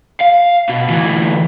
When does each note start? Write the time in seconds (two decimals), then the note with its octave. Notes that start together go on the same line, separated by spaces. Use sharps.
0.20 F5
0.69 B2
0.88 D2 E3